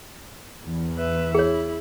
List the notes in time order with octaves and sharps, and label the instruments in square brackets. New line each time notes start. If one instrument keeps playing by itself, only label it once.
[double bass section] E2
[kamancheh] B4 E5
[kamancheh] E4 [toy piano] G#4 C#5